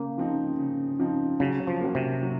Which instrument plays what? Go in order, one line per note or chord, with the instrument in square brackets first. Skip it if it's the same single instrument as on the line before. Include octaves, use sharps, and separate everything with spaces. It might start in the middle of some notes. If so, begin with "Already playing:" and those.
Already playing: [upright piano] C#3 [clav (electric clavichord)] A#3
[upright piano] F3 C4 D#4
C#3
F3 C4 D#4
[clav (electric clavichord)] C#3 [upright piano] F#3
[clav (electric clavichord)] F3
[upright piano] A#3 C#4 F#4
[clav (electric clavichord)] C3
[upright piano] F#3